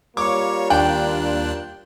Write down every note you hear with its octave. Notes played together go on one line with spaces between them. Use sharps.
G3 A#3 F4 C#5 C#6 D6
D#2 D4 G5 F#6